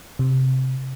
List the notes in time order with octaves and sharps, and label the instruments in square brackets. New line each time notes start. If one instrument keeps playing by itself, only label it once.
[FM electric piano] C3